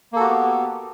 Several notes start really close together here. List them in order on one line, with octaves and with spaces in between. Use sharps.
A#3 A4 F#4 G4 B3